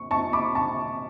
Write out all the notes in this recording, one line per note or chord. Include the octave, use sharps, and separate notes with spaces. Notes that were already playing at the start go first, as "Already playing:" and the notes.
Already playing: C#6
A5 C#6
B5 D6
A5 C#6